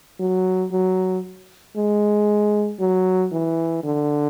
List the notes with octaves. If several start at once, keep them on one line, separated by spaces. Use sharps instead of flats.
F#3
F#3
G#3
F#3
E3
D3